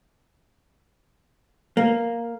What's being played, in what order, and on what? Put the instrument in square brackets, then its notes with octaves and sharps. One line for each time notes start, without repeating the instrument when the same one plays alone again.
[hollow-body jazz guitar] A#3